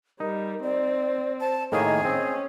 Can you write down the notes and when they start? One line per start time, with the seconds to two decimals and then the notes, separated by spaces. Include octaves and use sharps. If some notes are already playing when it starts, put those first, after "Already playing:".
0.20 G3 D#4 A#4
0.63 C4 D5
1.40 C5 A5
1.72 A2 D#3 A#3 G#4 C#5 D#5
2.05 C4 C#4